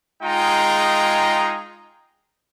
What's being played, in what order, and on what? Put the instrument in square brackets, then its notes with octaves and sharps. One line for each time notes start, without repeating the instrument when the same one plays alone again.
[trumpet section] G#3 D#4 F4 G#4 G5 A#5